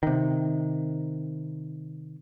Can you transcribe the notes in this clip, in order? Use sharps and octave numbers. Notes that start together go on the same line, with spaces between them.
C3 D#3